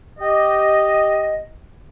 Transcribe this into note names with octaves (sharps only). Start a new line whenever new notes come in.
G4 D#5